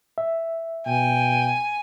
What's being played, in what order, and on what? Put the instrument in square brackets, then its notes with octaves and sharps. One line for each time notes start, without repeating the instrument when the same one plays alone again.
[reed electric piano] E5
[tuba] B2 [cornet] G5 [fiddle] G#5